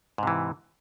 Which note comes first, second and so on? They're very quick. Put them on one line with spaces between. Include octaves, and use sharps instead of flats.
G#2 C3 E3